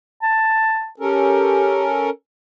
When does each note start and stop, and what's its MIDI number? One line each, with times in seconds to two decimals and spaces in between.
0.23 0.90 81
1.00 2.10 61
1.00 1.89 67
1.00 2.10 69
1.00 2.10 70